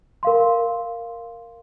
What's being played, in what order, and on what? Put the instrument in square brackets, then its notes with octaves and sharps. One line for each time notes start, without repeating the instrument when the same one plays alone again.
[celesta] A#4 F5 C6